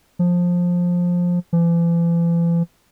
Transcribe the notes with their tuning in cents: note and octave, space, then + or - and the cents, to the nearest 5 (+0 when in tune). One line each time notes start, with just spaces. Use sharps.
F3 +15
E3 +45